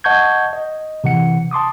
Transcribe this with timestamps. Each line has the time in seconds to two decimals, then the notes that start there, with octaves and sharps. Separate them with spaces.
0.04 D#5 F#5 A5 C#6 G6 G#6
0.53 D#5
1.04 C3 E3 F#5 C#7
1.51 A5 C6 D6 D#6